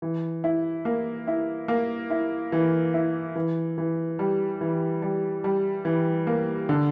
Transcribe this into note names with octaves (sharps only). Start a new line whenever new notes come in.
E3
E4
A#3
E4
A#3
E4
E3
E4
E3
E3
G3
E3
G3
G3
E3
A#3
D3